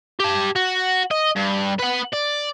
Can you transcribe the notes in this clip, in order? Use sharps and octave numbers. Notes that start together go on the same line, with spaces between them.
G4 A5
F#4
D#5
G2
B4 F#5
D5